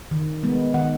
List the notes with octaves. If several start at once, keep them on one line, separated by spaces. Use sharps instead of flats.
D#3
G#3 B3
D#3 F#5